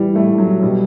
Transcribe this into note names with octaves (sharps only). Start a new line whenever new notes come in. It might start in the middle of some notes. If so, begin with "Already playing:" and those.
Already playing: A2 E3 G3
A2 A3
F#3
B2 G3